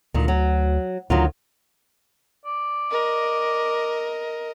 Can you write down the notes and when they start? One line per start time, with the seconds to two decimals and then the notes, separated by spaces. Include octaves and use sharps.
0.14 D2 A#2 D#3
0.28 F#3
1.10 D2 D#3 F#3 F4
2.45 D5
2.91 A#4 D#5